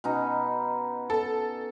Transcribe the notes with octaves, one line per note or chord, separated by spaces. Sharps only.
B2 C#4 D#4
A4